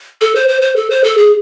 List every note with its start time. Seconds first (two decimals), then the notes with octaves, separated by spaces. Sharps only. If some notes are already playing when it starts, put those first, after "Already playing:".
0.21 A4
0.35 C5
0.49 C5
0.62 C5
0.76 A4
0.90 C5
1.04 A4
1.17 G#4